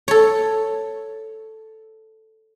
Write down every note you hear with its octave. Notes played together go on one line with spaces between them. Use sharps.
A4 C#5